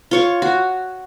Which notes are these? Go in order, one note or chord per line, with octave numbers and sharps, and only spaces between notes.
F4 C#5 C#6
F#4